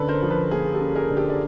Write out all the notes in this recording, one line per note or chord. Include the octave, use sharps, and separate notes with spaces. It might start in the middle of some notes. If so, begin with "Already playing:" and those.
Already playing: D3 C#4 A4 B4
A#4 C5
F3
A4 B4
A#3 G#4
G4 A4
C#4
G#4 A#4
D3
G4 A4
D5